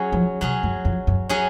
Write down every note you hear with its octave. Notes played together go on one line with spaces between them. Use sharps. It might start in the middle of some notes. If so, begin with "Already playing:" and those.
Already playing: F#3 C#4 G#4
F3
C3 F#3 C#4 G#4
F#2
F2
F#2
F#3 C#4 G#4